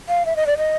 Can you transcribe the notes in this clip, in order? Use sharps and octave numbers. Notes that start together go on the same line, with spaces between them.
F5
E5
D#5
D5
D#5